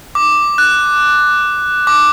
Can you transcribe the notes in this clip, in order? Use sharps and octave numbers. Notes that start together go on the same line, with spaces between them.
D6
F#6
D6